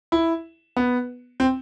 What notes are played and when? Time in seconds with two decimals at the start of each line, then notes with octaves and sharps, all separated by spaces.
0.12 E4
0.77 B3
1.40 C4